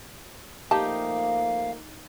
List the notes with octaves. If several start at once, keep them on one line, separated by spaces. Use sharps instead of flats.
F3 A3 A#3 D#4 G4 F5 A5